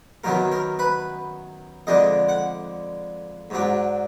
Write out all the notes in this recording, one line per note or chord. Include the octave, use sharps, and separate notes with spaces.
F#2 D#3 F#3 B3 A#4
A#4
B4
F2 D3 G#3 D4 D#5
F#5
G#2 F#3 D4